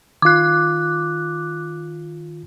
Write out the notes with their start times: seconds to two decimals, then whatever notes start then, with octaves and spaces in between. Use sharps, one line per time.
0.22 D#3 F4 D6 F#6